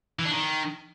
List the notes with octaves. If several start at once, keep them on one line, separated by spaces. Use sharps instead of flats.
E3
D4
D#3